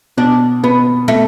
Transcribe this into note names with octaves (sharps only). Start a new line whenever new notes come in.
B2 D4
B2 B3
B2 A3